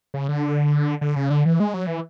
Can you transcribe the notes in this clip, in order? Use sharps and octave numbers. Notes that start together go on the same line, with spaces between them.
C#3
D3
D3
C#3
D3
E3
G#3
F#3
E3